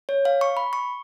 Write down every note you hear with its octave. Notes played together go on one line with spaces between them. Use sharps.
C#5
F5
C#6
B5
C#6